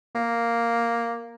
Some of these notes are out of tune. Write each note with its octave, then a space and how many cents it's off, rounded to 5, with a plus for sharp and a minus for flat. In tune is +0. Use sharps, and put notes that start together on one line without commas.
A#3 +0